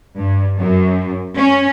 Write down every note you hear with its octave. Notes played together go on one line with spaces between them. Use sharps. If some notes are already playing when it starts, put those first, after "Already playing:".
G2
F#2
C#4